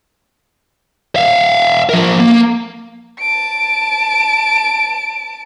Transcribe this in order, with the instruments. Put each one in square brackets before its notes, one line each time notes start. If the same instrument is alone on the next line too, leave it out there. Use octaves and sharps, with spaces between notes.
[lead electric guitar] E5 F5
F3 A#4
A#3
[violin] A5 D7